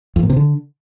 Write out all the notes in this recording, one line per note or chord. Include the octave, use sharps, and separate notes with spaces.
F2
A#2
C3
D3